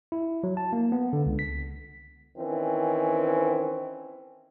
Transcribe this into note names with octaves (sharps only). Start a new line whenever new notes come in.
E4
F#3
A5
A#3
B3
D3
C#2
B6
D#3 E3 C4 C#4